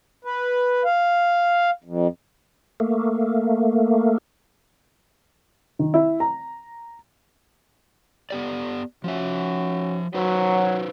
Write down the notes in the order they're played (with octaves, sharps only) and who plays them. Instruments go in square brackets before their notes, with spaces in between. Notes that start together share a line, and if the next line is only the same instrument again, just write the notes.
[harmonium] B4
F5
F2
[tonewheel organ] A3 A#3
[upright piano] D#3
E4
A#5
[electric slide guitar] B3 G4 D5
[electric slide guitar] F3 E5 [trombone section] C#4 F#4
[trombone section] F#3 [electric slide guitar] D#4 B4 C5